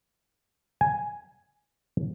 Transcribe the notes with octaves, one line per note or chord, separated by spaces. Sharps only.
G#5